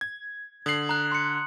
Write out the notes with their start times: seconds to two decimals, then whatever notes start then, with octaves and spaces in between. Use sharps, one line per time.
0.01 G#6
0.66 D3 D#6 C7 F#7
0.89 A#5 F#6
1.12 C6 C#7